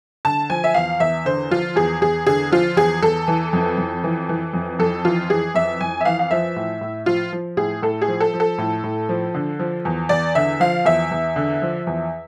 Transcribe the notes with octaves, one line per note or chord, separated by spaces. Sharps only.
D3 A5
F3 G#5
E5
E2 F5
E2 E5
D3 C5
F3 F4
E2 G#4
E2 G#4
D3 G#4
F3 F4
E2 G#4
E2 A4
E3
F2
F2
E3
E3
F2
F2 A4
E3 F4
E3 G#4
F2 E5
F2 G#5
E5
E3 F5
F5
F3 E5
A2
A2
F3 F4
F3
A2 G#4
A2 A4
G#4
F3
A4
F3
A4
A2
A2
F3
D3
F3
E2
E2 D5
D3 E5
F3 F5
E2 E5
E2
D3
F3
E2